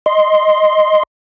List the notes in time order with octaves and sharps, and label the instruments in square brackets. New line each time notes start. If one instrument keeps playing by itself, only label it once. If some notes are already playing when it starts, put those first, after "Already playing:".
[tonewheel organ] D#5 C6